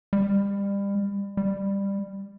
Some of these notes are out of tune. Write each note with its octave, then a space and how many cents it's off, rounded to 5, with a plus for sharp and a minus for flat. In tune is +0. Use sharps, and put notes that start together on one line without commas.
G3 +30
G3 +15